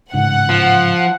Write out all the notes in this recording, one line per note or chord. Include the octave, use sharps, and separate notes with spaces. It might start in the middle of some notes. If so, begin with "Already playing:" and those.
A1 G#2 C#3 F#5
F3